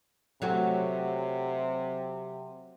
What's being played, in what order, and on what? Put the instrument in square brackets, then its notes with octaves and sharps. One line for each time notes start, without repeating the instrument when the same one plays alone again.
[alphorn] C3 [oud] F#3 A3 F#4